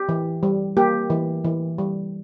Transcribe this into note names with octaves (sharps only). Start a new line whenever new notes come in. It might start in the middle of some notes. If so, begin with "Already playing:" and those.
Already playing: G4
E3
G3
A#3 G4
E3
E3
G3